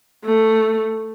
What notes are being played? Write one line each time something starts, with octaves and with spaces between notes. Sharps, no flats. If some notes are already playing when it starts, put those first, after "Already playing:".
A3